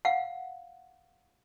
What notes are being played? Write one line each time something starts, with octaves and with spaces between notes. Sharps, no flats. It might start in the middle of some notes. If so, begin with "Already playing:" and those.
F5 F#5